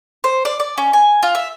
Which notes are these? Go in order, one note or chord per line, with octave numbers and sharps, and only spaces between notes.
C5
D5
D5
C#4
G#5
F4
E5